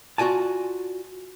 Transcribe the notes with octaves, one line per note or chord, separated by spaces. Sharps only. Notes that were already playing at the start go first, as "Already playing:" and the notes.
F4 F#4 D5 G#5 A5